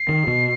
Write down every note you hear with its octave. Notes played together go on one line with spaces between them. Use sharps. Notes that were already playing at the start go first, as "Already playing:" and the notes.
Already playing: C7
D#3
B2